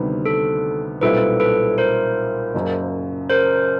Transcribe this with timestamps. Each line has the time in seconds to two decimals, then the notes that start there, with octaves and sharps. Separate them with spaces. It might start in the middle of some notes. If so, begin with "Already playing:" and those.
Already playing: D2 C3 D#3 G3 B3
0.26 A4
1.01 B1 A#2 G3 C4 E4 A4 B4
1.40 A4 B4
1.78 A#4 C5
2.54 F#1 F#2 C#3
3.30 A#4 C5